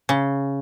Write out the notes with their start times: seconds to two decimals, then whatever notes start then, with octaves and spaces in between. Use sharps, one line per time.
0.09 C#3